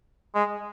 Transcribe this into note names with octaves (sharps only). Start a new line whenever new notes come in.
G#3